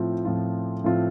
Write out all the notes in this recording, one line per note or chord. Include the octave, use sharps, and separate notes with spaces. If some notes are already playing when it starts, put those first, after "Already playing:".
Already playing: A2 F3 C4 F4
A2 F3 C4 F4
A2 F3 C4 F4